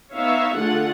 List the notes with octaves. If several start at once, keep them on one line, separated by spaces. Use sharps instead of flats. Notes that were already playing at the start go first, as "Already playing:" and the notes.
B3 D#4 C#5 E5 F5
D3 A3 F4 G#4 F#5